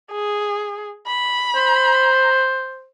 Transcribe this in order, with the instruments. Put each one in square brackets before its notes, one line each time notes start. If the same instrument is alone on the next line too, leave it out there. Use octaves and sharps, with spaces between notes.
[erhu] G#4
B5
[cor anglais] C5